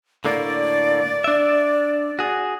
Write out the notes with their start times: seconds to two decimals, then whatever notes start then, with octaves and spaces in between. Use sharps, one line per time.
0.25 A2 D3 A#3 D5
1.24 D4 E5
2.19 F#4 G#4